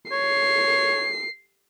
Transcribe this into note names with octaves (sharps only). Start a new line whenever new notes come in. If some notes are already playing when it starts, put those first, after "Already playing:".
C#5 C7